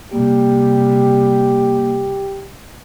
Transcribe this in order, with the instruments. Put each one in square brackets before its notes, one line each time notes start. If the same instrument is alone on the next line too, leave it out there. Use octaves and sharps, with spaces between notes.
[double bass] C3 G3 [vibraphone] A#3 [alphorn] G4